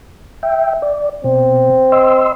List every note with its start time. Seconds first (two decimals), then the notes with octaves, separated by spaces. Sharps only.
0.43 E5 G5
0.82 D5
1.24 B2 C4
1.92 D#5 C6 E6